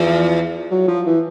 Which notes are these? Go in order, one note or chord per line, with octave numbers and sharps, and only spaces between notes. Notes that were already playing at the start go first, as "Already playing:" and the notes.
Already playing: E2 F3
F#3
F3
E3